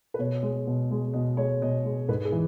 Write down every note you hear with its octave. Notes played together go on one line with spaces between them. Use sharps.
B4
B2 C#5
G#3
B2
G#3
B2 D#5
G#3 C#5
B2 D#5
G#3
G#2 B4
G#4
E3